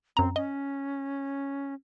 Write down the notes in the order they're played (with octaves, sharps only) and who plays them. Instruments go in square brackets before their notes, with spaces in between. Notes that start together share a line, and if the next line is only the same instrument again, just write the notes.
[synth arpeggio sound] F#2 A#5 [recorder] C4
[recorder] C#4 [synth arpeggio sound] D#5